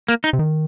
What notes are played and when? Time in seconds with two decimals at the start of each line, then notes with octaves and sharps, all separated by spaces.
0.08 A#3
0.24 D#4
0.33 C3
0.39 D#3